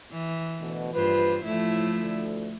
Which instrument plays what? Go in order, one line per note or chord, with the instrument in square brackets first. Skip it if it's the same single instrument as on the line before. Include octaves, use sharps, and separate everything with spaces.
[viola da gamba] E3
[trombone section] D2 B2
[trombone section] A#1 B4 [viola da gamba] G2 F4 C5
[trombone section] A2 [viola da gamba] F3 A3 E4
[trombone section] D2